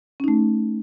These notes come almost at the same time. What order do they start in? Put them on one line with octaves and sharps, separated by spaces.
C#4 D#4 A3